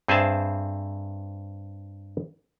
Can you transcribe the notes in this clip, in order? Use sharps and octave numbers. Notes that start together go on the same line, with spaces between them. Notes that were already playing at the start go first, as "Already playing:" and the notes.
G2 C4 G#4 C5 E5 A5